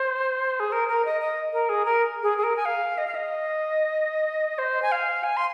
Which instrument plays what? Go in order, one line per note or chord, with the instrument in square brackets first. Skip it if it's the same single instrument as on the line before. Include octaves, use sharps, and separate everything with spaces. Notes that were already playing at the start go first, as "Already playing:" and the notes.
Already playing: [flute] C5
G#4
A#4
A#4
D#5
D#5
A#4
G#4
A#4
G#4
G#4
A#4
G#5
F5
D#5
F5
D#5
C5
G#5
F5
G#5
C6